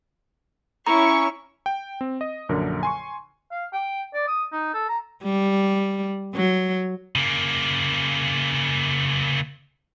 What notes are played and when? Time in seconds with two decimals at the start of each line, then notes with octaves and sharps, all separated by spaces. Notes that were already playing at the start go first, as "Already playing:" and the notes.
0.87 C#4 E4 A#5 C#6
1.66 G5
2.01 C4
2.21 D#5
2.49 A#1 F#2 D3 A#4
2.83 G#5 C6 C#6
3.52 F5
3.73 G5
4.14 D5
4.28 D#6
4.52 D#4
4.74 A4
4.89 A#5
5.23 G3
6.34 F#3
7.16 C#3 A#3